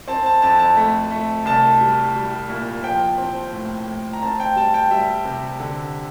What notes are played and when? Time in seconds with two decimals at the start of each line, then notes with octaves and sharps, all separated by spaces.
0.08 C4 A5
0.26 A5
0.42 F2 A5
0.59 A5
0.77 A3
1.11 A3
1.46 C2 A5
1.81 G3
2.15 G3
2.50 A#2
2.84 F3 G5
3.18 C4
3.53 A2
3.87 A2
4.13 A#5
4.22 C4 A5
4.40 G5
4.56 G3 A5
4.74 G5
4.91 G3 E5
5.25 C3
5.60 D3